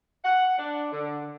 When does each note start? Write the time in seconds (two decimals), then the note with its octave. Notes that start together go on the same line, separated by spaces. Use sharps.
0.24 F#5
0.58 D4
0.92 D3